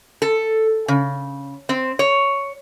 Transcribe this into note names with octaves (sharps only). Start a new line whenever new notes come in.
A4
C#3
C4
C#5